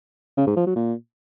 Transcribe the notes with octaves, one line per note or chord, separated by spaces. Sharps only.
C#3
G#2
F3
F#3
A#2